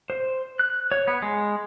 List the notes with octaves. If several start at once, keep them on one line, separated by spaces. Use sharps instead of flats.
C5
F#6
C#5
B3
G#3